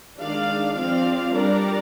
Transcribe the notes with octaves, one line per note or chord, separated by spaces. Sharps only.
D#3 G#3 D4 D5 F5
F3 C4 D5 F5
G3 D4 A#4 D5